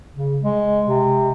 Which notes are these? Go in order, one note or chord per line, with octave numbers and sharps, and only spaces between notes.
C#3
G#3
C3